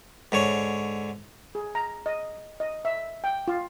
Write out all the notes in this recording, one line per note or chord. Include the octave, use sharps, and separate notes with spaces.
G#2 D3 C#5
G#4
A#5
D#5
D#5
E5
G5
F4